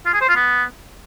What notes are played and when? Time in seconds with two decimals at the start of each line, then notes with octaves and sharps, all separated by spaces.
0.06 F4
0.13 G#4
0.21 C5
0.28 F4
0.36 B3